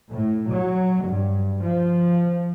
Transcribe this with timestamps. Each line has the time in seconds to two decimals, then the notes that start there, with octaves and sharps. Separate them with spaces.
0.12 A2
0.51 F#3
1.06 G2
1.63 F3